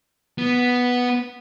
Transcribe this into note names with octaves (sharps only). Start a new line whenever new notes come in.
B3